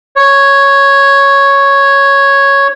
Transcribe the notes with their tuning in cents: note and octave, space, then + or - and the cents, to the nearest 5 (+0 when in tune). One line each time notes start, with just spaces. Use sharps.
C#5 +0